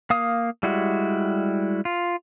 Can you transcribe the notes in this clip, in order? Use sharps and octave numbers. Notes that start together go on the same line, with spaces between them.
A#3 F5 D#6
G3 G#3 E4 F#4
F4